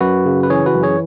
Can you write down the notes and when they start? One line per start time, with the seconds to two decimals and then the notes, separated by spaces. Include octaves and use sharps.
0.01 F#2 F#4 B4
0.26 C#3
0.43 B4
0.50 E3 G#4 C#5
0.66 F#4 B4
0.75 F#2
0.83 G#4 C#5